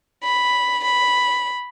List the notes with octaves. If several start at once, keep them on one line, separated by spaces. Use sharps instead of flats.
B5
B5